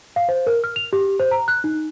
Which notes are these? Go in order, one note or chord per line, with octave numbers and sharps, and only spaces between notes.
F5
C5
A#4
F6
F7
G4
C5
A#5
F#6
D#4